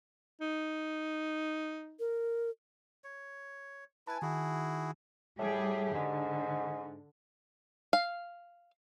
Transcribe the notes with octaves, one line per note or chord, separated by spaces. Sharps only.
D#4
A#4
C#5
E4 B4 G#5 A5
D#3 E4 F#4 G#4
A2 G3 G4 G#4
G#2 D3
F5